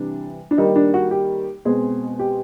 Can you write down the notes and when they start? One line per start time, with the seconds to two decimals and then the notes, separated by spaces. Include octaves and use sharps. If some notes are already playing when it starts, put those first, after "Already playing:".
Already playing: C3 E3 G3 D4
0.51 D4
0.58 D#3 G3 A#3 D#4
0.76 D4
0.94 F#4
1.11 G4
1.65 B2 G#3 C4 G#4
2.19 G4